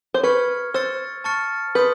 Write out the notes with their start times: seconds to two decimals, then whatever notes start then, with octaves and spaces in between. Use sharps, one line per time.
0.14 C5
0.23 B4 C#6 F6 G#6 C#7
0.74 C5 E6 A6 C#7
1.24 A5 C#6 F6 A6 C#7
1.75 B4 C6 D#6 G6